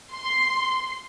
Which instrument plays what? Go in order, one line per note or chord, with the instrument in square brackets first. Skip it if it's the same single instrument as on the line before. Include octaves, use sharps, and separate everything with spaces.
[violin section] C6